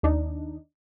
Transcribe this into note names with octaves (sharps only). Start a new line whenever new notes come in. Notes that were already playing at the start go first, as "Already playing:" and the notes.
D#2 D4 D#4